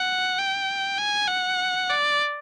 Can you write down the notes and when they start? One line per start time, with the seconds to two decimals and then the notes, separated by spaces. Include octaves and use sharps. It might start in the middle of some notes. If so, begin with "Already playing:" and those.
Already playing: F#5
0.38 G5
0.98 G#5
1.28 F#5
1.89 D5